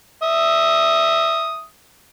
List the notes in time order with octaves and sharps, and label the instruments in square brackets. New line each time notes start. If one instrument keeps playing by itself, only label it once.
[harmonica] E5 D#6